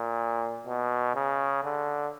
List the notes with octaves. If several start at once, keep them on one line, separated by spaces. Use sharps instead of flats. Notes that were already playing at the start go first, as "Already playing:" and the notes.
Already playing: A#2
B2
C#3
D3